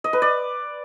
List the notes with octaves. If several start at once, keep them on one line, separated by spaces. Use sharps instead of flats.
D#5
B4
D5